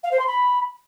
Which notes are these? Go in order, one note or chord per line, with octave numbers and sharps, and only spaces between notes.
F5
C5
C6
B5